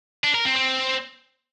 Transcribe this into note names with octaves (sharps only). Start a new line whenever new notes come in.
D4
A#4
C4
C4